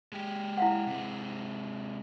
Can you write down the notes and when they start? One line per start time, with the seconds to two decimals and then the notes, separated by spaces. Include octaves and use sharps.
0.12 G#3 G4
0.57 E4 F5 F#5
0.87 C3 G#3